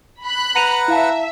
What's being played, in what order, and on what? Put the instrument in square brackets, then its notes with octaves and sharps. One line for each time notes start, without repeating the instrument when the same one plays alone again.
[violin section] B5 F#6
[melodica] B4 F#5 [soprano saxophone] A#5 [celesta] C#7 D#7 F7
[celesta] E4 F5 A5 [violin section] E5